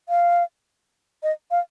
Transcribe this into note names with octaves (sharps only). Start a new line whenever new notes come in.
F5
D#5
F5